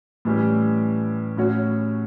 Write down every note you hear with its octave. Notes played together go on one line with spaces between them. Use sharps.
A2 E3 G3 C#4 G4
A2 F#3 C#4 F#4 C#5